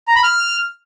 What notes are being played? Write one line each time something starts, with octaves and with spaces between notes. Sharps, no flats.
A#5
B5
F6